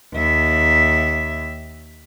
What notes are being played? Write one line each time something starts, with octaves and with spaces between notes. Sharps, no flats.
D#2 E5